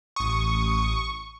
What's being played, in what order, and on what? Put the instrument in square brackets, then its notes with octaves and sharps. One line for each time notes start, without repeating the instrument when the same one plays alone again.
[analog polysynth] A1 D#6 [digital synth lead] C#6